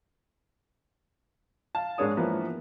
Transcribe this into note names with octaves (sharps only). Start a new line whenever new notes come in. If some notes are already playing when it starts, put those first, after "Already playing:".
F5 A5
G#2 G#3 D4 A#4 C#5 D#6
E3 F3 A#3 B3